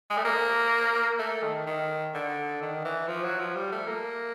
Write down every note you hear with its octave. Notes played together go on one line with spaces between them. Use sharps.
G#3
A3
A#3
A3
D#3
D#3
D3
D#3
E3
F3
F#3
F3
G3
A3
A#3